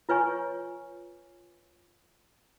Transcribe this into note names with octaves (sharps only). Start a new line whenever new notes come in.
F4 B4 C#5 G#5 C#6